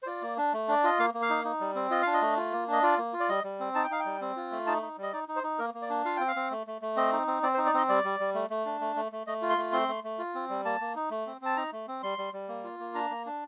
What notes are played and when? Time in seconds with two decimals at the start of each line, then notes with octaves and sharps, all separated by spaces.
0.03 C5
0.06 F4 D5
0.22 A#3
0.37 D4
0.53 A3
0.68 D4 D5
0.84 F4 D#5
0.99 A#3 F5
1.14 A#3
1.22 F5
1.30 D#4
1.45 D#4
1.60 G3
1.75 C4
1.91 F4 D#5
2.02 D4 F5
2.13 D#5
2.22 A3
2.37 F4
2.52 A#3
2.67 D4 D#5
2.83 F4 D5
2.98 A#3
3.13 F4
3.20 D5
3.29 G3 D#5
3.44 G3
3.60 C4
3.75 D#4 A5
3.83 G5
3.90 D#4 F5
4.00 G5
4.05 G3
4.21 C4
4.36 F4
4.51 A3
4.67 D#4 A5
4.82 D#4
4.98 G3
5.03 D#5
5.13 D#4 D5
5.28 D#4
5.36 C5
5.43 D#4
5.59 A#3 A#4
5.74 A#3
5.82 D5
5.89 D4
6.05 F4 F5
6.16 C4 G5
6.28 F5
6.36 C4
6.51 A3
6.67 A3
6.82 A3
6.97 C4 D#5
7.12 D#4
7.27 C4
7.43 C4 D5
7.54 C5
7.58 D#4
7.66 D5
7.74 C4 D#5
7.89 G3 D5
8.04 G3
8.20 G3
8.35 A3
8.50 A3
8.65 D4
8.81 A3
8.96 A3
9.12 A3
9.27 A3 D#5
9.42 F4
9.50 C6
9.58 A3
9.72 C4 C6
9.88 A3
10.04 A3
10.19 F4
10.35 C4
10.49 G3
10.65 A#3 A5
10.81 A#3
10.95 D#4
11.11 A3
11.27 C4
11.41 C4 A5
11.57 D#4 A#5
11.72 A3
11.88 C4
12.03 G3 C6
12.18 G3
12.33 G3
12.49 A#3
12.64 F4
12.80 A#3
12.94 D4 A#5
13.10 A#3
13.26 D4